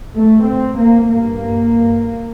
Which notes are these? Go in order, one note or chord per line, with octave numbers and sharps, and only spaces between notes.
A3
C4
A#3
G2 A#3